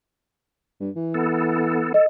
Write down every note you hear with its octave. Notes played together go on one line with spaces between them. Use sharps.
G2
E3
B3 A4
A4 D#5